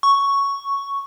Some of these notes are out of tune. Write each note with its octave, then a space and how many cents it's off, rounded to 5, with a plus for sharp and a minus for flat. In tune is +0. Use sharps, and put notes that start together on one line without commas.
C#6 +5